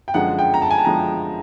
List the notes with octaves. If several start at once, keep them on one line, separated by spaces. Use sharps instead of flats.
G5
F#2 D3 F3 G#3 F#5
G5
A#5
A5
G#5
A5
D3 F3 G#3 A#5